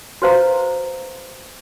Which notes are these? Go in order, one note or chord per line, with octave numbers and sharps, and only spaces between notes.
F#4 B4 C5 F5 A#5